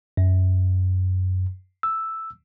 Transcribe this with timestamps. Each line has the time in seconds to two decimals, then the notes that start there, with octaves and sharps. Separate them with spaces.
0.17 F#2
1.83 E6